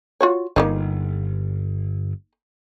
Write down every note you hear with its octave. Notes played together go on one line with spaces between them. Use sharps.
F4 F#4 C#5
G1 A#3 D4 D#4